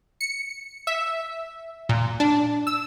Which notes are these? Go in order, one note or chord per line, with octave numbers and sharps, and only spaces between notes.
C#7
E5
A#2
D4
E6